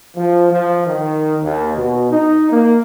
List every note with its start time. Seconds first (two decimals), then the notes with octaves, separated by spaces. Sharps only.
0.16 F3
0.51 F3
0.87 D#3
1.43 D#2
1.76 B2
2.11 D#4
2.51 A#3